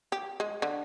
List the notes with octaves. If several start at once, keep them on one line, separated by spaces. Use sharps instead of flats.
G4
G#3
D3